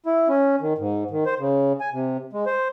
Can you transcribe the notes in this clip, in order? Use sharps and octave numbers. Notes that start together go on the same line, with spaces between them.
E4
C#4
D#3
G#2
D#3
C5
C#3
G#5
C3
G#3
C5